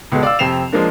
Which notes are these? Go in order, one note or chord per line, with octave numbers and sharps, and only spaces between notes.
C#2 B2 G#3 A4
D5 F5 E6
F2 C3 C4 C7 E7 F7
F3 G#3 A#3 D4